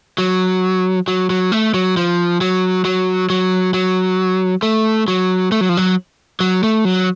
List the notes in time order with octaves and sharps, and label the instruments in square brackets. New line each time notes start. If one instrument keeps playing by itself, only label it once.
[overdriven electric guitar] F#3
F#3
F#3
A3
F#3
F3
F#3
F#3
F#3
F#3
A3
F#3
A3
F#3
F3
F#3
F#3
A3
F#3